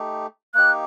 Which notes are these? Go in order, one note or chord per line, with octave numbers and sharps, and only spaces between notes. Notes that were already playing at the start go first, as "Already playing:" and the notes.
Already playing: A3 D#4 G4
A#3 D#4 G4 F#6